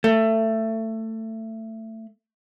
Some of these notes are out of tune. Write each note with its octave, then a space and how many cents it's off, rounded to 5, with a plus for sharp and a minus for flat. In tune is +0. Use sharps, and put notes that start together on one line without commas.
A3 +20